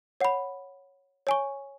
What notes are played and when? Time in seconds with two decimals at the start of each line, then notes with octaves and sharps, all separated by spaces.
0.21 C#5 F#5 B5
1.27 C#5 G#5 C#6